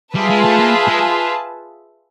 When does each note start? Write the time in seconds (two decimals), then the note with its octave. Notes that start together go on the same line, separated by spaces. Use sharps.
0.15 G3 F4 G#4 B4 E5 A5
0.29 G#3
0.44 A3
0.59 A#3
0.88 G#3